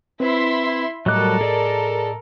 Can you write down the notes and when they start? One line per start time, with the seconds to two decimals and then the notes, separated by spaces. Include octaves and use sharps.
0.20 C4 E4 B4 E5 C6
1.06 A2 F#3 G3 A4 A#4 D#5 D6 F#6
1.41 G#4 D5